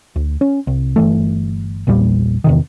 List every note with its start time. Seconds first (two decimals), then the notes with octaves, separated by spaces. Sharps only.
0.16 D2
0.41 C#4
0.67 C2
0.96 G1 E3 A3
1.87 A#1 E2 A#2 G3
2.44 E2 C3 D#3